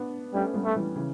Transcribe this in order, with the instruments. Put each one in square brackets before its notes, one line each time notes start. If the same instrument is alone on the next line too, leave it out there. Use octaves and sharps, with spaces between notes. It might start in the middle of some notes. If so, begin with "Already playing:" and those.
Already playing: [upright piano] B3 D4
[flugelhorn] G3 [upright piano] A3 C#4
[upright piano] G3 B3
[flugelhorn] A3
[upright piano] E3 G3
C#3 E3